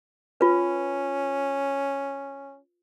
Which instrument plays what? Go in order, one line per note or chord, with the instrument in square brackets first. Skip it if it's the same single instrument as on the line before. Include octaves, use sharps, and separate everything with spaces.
[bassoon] C#4 [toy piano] F4 B4